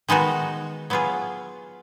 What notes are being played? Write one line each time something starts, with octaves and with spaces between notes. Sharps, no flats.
D#3 G#3 B3 D#4 F#4
F#3 B3 F4 G#4